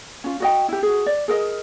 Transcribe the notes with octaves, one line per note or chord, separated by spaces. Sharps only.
C#4 F4
F#4 D#5 G5
E4 G4
F#4 G#4
D5
G#4 A#4 D#5